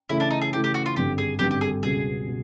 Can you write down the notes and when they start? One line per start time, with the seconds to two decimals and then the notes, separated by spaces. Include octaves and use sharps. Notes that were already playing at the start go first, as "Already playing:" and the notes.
0.09 C#3 E3 A3 C#4 E4
0.20 D4
0.30 D#4
0.41 G#4
0.53 C#3 E3 A3 C#4 G4
0.64 G4
0.74 F#4
0.86 F4
0.96 G#1 G2 D3 G4
1.18 G#4
1.39 G#1 G2 D3 G4
1.51 G4
1.61 G#4
1.83 C#2 B2 G3 G#4
2.27 B2